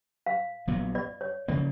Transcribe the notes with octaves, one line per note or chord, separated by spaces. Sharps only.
F5
A#1 A#2 F#3 B3
D5
C#5
C#3 F3 A#3 D5